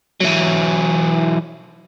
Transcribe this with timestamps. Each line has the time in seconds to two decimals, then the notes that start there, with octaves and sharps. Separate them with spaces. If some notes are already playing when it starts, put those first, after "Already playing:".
0.20 E3 F#3